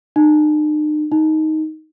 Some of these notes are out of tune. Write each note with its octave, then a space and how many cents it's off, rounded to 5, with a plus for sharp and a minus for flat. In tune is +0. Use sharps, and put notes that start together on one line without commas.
D#4 -45
D#4 +10